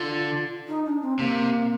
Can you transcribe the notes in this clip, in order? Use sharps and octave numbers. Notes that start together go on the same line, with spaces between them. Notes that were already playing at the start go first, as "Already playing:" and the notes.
Already playing: D3 F4
D#4
D4
C4
C3 A#3